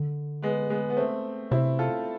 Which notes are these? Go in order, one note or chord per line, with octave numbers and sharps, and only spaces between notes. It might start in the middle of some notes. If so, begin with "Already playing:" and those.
Already playing: D3
G#3 B3
G#3 B3
B3
A3 C4
C3 C4 E4
F4 A4